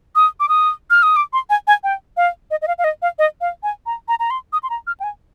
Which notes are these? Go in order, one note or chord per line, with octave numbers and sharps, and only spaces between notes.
D#6
D6
D#6
F6
D#6
D6
C6
G#5
G#5
G5
F5
D#5
D#5
F5
F5
D#5
F5
D#5
F5
G#5
A#5
A#5
A#5
C6
D#6
C6
A#5
F6
G5
G#5